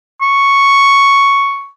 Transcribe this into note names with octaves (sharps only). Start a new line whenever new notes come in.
C#6